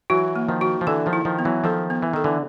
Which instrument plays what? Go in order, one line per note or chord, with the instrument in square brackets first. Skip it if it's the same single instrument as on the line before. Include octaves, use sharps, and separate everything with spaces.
[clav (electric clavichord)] E3 F#3 [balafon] F#4
[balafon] A#3
[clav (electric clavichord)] D#3 F3
[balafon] F#4
[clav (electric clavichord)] F3
[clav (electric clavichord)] D3 E3 [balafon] A4
[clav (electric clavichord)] D#3 F3
[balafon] E4
[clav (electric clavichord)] D#3 F3
[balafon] B3
[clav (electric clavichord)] E3 F#3
[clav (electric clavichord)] D#3 F3 [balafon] A4
[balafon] B3
[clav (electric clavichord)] E3
[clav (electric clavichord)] D#3 [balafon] A4
[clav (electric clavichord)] D3 E3